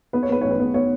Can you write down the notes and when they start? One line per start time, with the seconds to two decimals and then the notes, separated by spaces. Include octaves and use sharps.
0.13 B3 B4
0.23 C#5
0.29 B3 B4
0.41 A1 C#5
0.50 B4
0.60 B3
0.74 B3 C#5